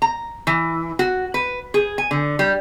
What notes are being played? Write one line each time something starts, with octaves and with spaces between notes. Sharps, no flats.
A#5
E3
F#4
B4
G#4
G#5
D3
G3